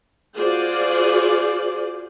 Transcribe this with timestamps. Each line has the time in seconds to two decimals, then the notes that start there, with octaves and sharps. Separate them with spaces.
0.37 F4 F#4 G#4 C5 D5